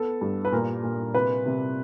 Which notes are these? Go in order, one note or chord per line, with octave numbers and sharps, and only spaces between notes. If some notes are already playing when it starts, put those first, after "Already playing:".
Already playing: B3 A4
G2
B4
A#2 A#4
A#2
C3 B4
C3